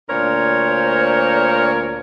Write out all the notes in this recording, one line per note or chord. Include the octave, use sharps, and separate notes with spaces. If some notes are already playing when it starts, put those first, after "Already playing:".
D2 A#2 D4 A#4 C5 C#5